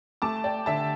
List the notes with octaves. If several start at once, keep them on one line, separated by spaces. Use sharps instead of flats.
A3 A5 D6
D5 G5
D3 E5 A5